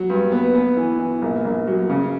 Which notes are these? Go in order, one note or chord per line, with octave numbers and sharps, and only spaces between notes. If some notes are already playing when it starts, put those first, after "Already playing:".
Already playing: F#3
G2
B3
B3
E3
E3
A#1
A#1
F#3
C#3